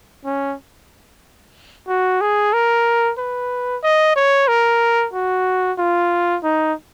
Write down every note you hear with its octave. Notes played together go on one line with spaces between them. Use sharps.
C#4
F#4
G#4
A#4
B4
D#5
C#5
A#4
F#4
F4
D#4